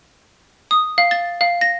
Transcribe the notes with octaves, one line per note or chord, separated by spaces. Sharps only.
D#6
F5
A6
F5
A#6